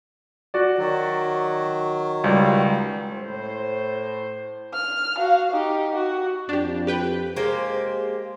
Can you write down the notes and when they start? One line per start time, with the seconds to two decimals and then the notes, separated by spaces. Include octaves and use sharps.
0.54 F#4 D5
0.78 D#3 F#3
2.24 C#2 G3
3.11 A2 C5
4.74 F6
5.17 F#4 F5
5.52 D#4 G4
5.93 F#4
6.49 F2 D4 G4
6.87 G4 B4 G5
7.36 G#3 A#3 G4 C5